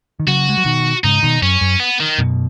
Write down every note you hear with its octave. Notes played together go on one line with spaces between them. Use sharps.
D#3
C#3 F#3 F#4
G#3
F#3
B2 D#3
G#2 C#3 D#4
B2 D#3
F#2 C#4
F#2
B3
D#3
F#2 B2